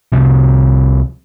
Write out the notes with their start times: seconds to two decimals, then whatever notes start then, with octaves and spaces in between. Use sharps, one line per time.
0.12 C2 C3 F3